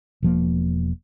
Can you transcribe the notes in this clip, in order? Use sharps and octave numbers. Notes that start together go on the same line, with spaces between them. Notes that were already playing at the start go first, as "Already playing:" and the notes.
E1 F3 A#3